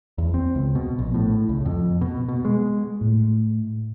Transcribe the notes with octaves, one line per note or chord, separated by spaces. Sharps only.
E2
C4
C#2
B2
A#1
A2
C#2
F2
B2
B2
G#3
A2